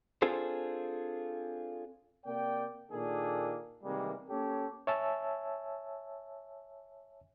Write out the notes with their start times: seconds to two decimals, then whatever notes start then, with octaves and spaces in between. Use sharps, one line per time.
0.22 C4 D4 F4 G#4 A4 C5
2.25 C3 A#3 D5 G5
2.91 A#2 D#3 A#3 D4 G#4 A4
3.83 C3 D#3 E3 G3 G#3 A#3
4.29 A#3 C#4 G4 A4 C#5
4.87 C#5 E5 G#5 A5 E6